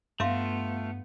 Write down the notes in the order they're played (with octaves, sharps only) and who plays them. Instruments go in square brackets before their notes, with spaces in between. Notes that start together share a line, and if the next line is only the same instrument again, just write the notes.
[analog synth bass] G2 [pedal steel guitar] A3 F4 [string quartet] B3 [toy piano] E5 F5 C6